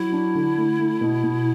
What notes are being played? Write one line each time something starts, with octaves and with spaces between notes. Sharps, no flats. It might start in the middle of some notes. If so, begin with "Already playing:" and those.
Already playing: F#3 E4
D4
D3
A3
A3
B2
B2